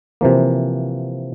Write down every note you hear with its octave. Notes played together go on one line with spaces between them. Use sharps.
C3 E3 F3 A#3